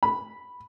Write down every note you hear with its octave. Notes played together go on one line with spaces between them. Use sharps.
B5